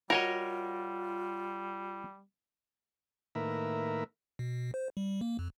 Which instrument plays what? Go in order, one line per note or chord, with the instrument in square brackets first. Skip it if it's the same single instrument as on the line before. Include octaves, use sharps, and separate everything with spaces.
[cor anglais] G3 [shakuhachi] F4 [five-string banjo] F#4 [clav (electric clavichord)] A#4 C#5 D#5
[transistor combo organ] A2 D#3 A#3 A#4 B4 E5
[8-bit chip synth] B2
C5
G3
A#3
F2